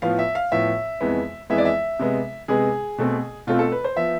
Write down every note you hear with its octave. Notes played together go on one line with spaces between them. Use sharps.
A2 F3 B3 F5
E5
F5
A2 F3 B3 E5
F2 E3 G#3 B3
F2 E3 G#3 B3 E5
D5
E5
C3 G#3 B3
C3 G#3 B3 G#4
B2 A3 C4
B2 A3 C4 F4
A4
B4
C5
F3 B3 E5